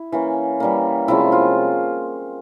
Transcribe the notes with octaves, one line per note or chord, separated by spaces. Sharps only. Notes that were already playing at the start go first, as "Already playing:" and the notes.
Already playing: E4
E3 A#3 C#4
E3 G3 A#3
C3 F3 G#3 C#4 E4
F4